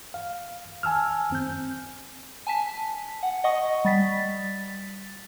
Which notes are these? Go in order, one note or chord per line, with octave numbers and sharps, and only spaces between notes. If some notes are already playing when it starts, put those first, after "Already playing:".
F5
G#5 A5 E6 F6
C4 G6
G#5 A5 B6
F#5
D#5 F#5 C#6 D#6
G3 A6 B6